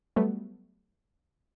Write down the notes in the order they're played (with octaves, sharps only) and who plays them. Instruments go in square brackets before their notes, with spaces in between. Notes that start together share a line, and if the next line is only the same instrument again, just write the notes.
[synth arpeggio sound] F#3 G3 A3 B3